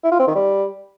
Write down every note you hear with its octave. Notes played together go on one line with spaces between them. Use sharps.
E4
F4
C4
D#3
G3